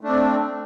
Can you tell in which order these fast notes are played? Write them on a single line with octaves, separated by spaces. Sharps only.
A3 D4 C4